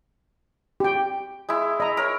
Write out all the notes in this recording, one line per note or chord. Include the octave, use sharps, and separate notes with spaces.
G4 G5
G#3 E4
D#5 A#5
A#4 C#5